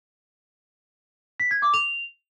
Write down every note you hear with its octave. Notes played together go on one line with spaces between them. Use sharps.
B6
G#6
D6
F7